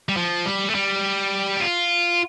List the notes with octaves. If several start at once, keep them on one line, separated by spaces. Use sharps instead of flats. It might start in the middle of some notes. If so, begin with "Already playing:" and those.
G3
F3
G3
A3
G3
G4
F4